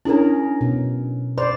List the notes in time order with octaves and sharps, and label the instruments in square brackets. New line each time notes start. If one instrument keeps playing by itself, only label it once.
[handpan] C#4 G#4 A#4 [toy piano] D4 E4
[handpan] B2
[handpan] C5 D5 [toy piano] B5